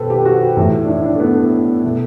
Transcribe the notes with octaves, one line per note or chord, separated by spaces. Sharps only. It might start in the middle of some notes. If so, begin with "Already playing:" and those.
Already playing: B2 G4 A4 B4 C5
G4
F#4
A2 E3
D4
E4
D4
A3
B3
B2 A3